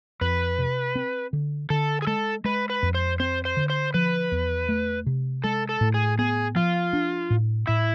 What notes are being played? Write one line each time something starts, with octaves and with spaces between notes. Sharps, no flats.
F2 B4
C3
C4
D3
D3 A4
G#4
G#3 A4
G#3 B4
B4
F2
C5
C4 C5
C5
D3
C5
F3 B4
E2
A3
C3
G#3 A4
A4
A2
G#4
B3 G#4
F3 F4
D4
A2
A2 E4